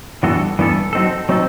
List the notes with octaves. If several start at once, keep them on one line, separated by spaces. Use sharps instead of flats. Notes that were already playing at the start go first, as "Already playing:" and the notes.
G2 E3 B3 F#4 A4
G2 E3 B3 F#4 A4
F#3 C4 D#4 A4
F#3 C4 D#4 A4